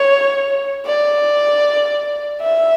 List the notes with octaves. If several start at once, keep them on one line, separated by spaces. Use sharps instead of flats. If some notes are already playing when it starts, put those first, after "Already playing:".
Already playing: C#5
D5
E5